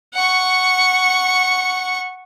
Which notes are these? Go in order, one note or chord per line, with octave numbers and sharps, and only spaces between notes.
F#5 C#6